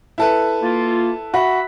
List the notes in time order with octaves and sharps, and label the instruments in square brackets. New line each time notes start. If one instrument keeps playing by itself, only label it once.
[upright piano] E4 A4 B4
[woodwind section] A#3 F4
[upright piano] F#4 [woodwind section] E5 B5